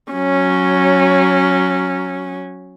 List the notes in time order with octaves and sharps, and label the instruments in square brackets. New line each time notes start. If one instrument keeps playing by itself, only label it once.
[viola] F#3 C#4